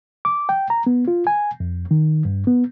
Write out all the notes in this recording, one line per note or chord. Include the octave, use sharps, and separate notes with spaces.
D6
G5
A#5
B3
F4
G#5
F2
D#3
G2
B3